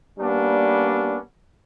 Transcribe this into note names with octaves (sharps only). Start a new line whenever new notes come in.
G3 A#3 B3 C#4 D4